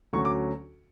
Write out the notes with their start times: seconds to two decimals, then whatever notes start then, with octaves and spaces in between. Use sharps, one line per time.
0.13 D2 D3 F#3 C#4 C#6
0.25 D6